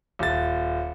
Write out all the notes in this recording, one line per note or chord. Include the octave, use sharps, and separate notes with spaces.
D#1 A6